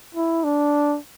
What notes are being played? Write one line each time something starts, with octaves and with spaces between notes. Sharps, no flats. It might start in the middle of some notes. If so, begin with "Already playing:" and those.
E4
D4